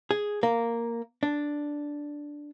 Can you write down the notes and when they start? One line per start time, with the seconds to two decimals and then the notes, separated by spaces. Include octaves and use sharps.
0.11 G#4
0.43 A#3
1.23 D4